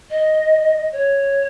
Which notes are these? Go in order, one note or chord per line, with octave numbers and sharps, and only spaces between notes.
D#5
C#5